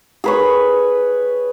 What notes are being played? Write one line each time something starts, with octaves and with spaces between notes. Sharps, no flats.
G#4 B4 C#5